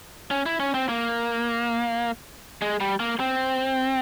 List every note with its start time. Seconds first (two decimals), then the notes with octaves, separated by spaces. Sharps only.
0.31 C#4
0.46 E4
0.60 C#4
0.74 C4
0.89 A#3
2.62 G#3
2.81 G3
3.00 A#3
3.20 C4